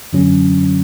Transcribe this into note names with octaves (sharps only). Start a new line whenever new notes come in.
F#2 D3 F#3 C#4